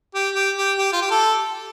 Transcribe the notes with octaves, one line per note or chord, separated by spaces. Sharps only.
G4
G4
G4
G4
F4
G4
A4